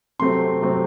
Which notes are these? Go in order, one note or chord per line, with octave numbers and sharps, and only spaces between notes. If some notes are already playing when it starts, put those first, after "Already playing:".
C3 F#3 A3 C4 C6
C3 F#3 A3 C4